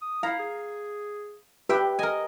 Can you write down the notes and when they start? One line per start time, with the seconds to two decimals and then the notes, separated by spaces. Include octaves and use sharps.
0.02 D#6
0.23 E4 F5 A#5
0.39 G#4
1.69 G4 B4 E5 G5
1.99 A#4 D#5 G#5